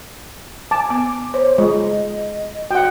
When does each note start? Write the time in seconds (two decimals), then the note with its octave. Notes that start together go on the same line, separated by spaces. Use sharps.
0.71 G#5 A5 D6
0.90 B3 D6
1.34 C5 C#5
1.58 G#3 F4 D#5
2.71 F#4 F#5 G5